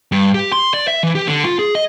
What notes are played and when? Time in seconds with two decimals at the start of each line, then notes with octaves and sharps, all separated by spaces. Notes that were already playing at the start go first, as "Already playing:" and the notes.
0.12 G2
0.34 G4
0.52 C6
0.74 D5
0.87 E5
1.03 E3
1.15 G4
1.27 D3
1.45 F4
1.59 G#4
1.75 D#5